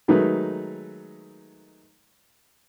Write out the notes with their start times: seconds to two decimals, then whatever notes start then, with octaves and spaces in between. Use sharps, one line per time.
0.08 D#3 F#3 G#3 A3 D#4 B4